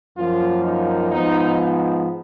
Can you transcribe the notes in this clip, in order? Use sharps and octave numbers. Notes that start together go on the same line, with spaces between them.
F#2 F3 A#3 F4
D#4
G#2 F3 B3 D#4
D#4